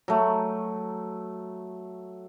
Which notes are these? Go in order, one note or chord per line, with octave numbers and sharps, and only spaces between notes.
F#3 A3